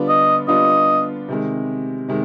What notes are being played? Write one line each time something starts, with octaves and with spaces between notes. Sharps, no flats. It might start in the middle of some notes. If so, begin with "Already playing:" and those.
Already playing: D3 G3 B3 D4 F4
D#5
D3 G3 B3 D4 F4 D#5
C3 D#3 G#3
C3 D#3 G#3